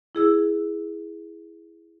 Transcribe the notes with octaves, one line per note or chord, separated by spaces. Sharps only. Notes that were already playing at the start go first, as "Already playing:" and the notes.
E4 G#4 E6